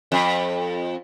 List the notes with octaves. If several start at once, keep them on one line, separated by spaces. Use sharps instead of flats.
F2